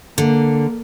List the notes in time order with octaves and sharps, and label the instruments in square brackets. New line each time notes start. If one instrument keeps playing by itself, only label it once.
[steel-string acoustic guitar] D3 [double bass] A#3